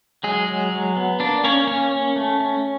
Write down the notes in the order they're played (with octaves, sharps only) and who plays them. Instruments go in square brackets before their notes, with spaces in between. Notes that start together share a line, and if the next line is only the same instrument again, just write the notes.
[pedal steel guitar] F#3 G#3 G#4
F#3
F#3
B3
A#3 D4 D5
A#3 C#4 C#5
A#3 C#4 C#5
C#4
A3
C#4